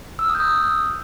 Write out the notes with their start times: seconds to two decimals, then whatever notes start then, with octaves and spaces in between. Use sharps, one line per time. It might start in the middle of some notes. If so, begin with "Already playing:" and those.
0.19 E6
0.24 F6
0.29 D#6
0.35 G6
0.40 D#6